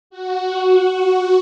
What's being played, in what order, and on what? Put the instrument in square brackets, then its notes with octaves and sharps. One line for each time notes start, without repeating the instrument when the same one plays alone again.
[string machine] F#4